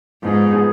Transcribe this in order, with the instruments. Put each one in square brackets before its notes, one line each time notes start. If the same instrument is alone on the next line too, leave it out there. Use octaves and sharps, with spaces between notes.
[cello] G#2 [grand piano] F3 B3 D#4 G#4
[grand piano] F3 B3 D#4 G#4